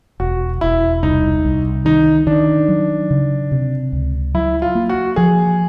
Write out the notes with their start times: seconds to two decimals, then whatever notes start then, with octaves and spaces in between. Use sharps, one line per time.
0.20 E1 F#4
0.61 E1 E4
1.03 C2 D#4
1.45 C2
1.85 D#3 D#4
2.27 D#3 D4
2.69 F#3
3.11 C#3
3.51 C3
3.92 C#2
4.34 F#3 E4
4.62 F4
4.75 A#3
4.89 F#4
5.16 F3 G#4